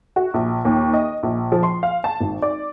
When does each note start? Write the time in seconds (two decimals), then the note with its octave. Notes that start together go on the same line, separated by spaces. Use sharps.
0.16 F#4
0.34 A#1
0.65 D#2
0.94 D#5
1.23 A#1
1.52 F3
1.63 C6
1.83 F5
2.04 A5
2.21 G#1
2.42 D5